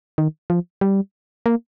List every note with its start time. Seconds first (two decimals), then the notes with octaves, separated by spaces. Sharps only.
0.18 D#3
0.50 F3
0.81 G3
1.46 A#3